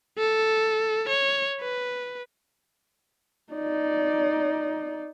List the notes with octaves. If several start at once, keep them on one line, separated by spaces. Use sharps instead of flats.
A4
C#5
B4
D#4 D5